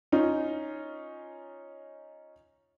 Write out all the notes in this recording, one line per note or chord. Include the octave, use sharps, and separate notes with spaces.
C#4 D#4 F4